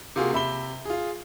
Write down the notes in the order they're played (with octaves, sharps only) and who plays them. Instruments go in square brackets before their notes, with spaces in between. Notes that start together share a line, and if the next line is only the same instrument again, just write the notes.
[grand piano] C3 A#3 F4 F#4 G#4
C3 E5 B5 G7
F4 G#4